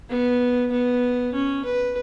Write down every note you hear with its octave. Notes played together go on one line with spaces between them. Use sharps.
B3
B3
C#4
B4